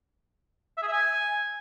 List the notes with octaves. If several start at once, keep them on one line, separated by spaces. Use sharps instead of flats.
E5
G#4
E5
G#5